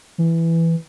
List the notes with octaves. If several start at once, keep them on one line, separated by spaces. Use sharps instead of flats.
E3